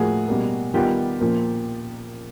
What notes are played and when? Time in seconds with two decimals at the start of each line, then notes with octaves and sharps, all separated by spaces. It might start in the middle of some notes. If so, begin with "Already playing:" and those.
Already playing: A2 F3 A#3 F#4 G#4
0.28 B2 G3 A#3
0.74 D#3 G3 B3 F4 G4
1.21 A#2 F3 A#3